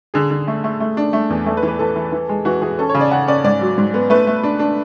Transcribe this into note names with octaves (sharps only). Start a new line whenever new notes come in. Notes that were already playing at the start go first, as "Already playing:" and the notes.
D3 G#4
D3
A3
A3
A3
D4
A3
E2
A3 A4
B4
E3
B4
E3 A4
E3
E3
G#3
E3 F#4
E3 G#4
C#4 A4
C#5
C#3
D5
C#3 F#5
C#4 D5
G#2 D5
F#3
G#2
B3
A3 B4
A3
D4
D4